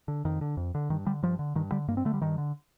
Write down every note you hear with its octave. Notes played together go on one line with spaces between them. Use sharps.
D3
F2 D#3
D3
F2
D3
G2 D#3
D3 G3
G2 F3
D3
G2 D#3
D3 G3
G2 A#3
C4
D3 A3
G3
G2 D#3
D3